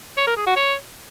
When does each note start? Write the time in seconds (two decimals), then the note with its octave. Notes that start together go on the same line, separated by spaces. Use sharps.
0.17 C#5
0.27 A#4
0.37 G#4
0.47 F#4
0.57 C#5